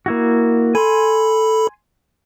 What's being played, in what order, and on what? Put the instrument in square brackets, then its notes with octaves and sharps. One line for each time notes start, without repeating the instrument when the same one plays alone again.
[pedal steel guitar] A#3 E4 F#4
[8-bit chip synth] A4 B5 [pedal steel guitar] G#5 C6